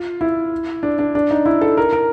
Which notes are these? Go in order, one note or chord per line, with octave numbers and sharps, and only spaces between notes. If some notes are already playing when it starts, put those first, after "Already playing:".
Already playing: F4
E4
D4
D4
D4
D#4
E4
A4
A#4
A#4